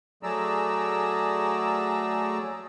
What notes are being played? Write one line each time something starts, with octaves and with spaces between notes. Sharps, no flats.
F#3 A3 G#4 D5 A#5 E6